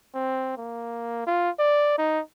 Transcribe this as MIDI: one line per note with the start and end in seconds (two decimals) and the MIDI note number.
0.14 0.54 60
0.57 1.26 58
1.26 1.50 65
1.59 1.96 74
1.98 2.20 63